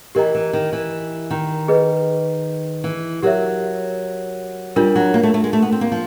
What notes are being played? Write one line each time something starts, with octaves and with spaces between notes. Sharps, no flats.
E3 G4 A#4 D#5 G5 A#5
E3
D#3
E3
D#3
G#4 B4 D#5
E3
F#3 G4 A#4 C#5 E5
G3 D4 F4 A#4
F#3
A#3
A3
A3
G#3
A3
B3
C4
A#3
F3